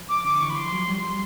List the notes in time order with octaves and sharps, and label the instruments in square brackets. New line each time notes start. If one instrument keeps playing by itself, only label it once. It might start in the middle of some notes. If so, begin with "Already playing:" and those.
Already playing: [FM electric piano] F3
[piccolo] D6
[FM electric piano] D3 [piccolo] D6
[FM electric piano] E3 [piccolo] C#6
[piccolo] B5
[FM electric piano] E3
[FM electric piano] F3 [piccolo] C6
[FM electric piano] F#3
G3